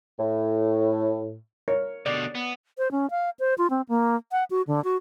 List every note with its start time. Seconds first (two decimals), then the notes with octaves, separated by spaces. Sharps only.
0.19 A2
1.68 A#4 C#5
2.06 B2 D3 D5
2.35 B3
2.78 C5
2.91 C#4
3.10 F5
3.40 C5
3.58 F4
3.70 C4
3.89 A#3
4.32 F#5
4.51 F#4
4.67 D3
4.84 F#4